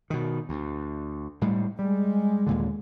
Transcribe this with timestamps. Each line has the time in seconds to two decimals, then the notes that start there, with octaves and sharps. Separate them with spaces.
0.10 B2 D#3
0.49 D2
1.41 A2 G3 G#3
1.79 G3 G#3
2.46 D#2 A#2 D3